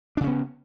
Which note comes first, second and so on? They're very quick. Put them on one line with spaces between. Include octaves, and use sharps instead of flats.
D4 C#3 C#4 B3